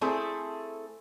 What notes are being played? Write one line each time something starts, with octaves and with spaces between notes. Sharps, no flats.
A3 C4 E4 G#4 A4